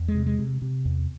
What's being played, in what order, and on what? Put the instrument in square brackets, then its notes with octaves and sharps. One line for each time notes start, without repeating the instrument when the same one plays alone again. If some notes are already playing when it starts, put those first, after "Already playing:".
Already playing: [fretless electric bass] E2
G#3
C3
G#3
C3
C3
E2